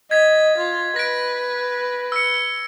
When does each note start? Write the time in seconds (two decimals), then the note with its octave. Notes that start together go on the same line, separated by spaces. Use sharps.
0.11 D#5 G#6 B6
0.58 F4
0.96 B4 A#6 D7
2.12 E6 C#7